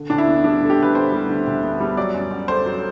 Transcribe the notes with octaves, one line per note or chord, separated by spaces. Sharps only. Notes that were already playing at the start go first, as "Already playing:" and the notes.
Already playing: D3
D2 D4
E4
B3
G3 D4
D3 A4
G4
D2 B4
B3 C5
G3
D3
D2
B3
G3
F#3 D5
F#2
F#2
A3 C5
F#3